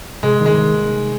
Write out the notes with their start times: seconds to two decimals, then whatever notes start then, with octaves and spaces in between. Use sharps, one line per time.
0.23 C3 G#3
0.38 D#3 G3 A#3
0.46 G#3
0.53 C3